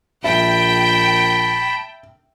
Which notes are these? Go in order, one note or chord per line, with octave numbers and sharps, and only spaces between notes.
A#1 E5 G5 A5 B5